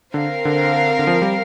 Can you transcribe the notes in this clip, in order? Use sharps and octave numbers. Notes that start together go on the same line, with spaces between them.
D3 C4 A#4 F5
D3
D3
F3
G3